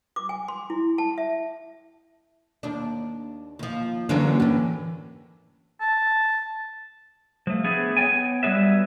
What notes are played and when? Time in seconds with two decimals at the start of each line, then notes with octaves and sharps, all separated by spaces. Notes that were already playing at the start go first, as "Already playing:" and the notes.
0.16 D6
0.29 G#5
0.48 C6
0.70 E4
0.98 A5
1.18 E5
2.63 D#2 D4
3.59 D#2 F3
4.09 D3 E3 F#3 A#3 C#4 D4
4.40 A2 E3
5.80 A5
7.47 F3 A3
7.64 A3 B3 D4 G#4
7.97 B3 C#5 D5 G5 G#5
8.43 F#3 G3 B3 G#4 B4 E5